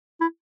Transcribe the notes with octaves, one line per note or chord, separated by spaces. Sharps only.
E4